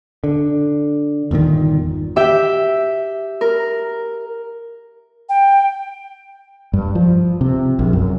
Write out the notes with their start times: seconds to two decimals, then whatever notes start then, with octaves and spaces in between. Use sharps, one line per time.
0.24 D3
1.31 G1 E2 A#2 D#3
2.16 G4 E5 G5
3.41 A#4
5.29 G5
6.73 G2
6.95 F3
7.41 C3
7.79 A#1
7.93 F#2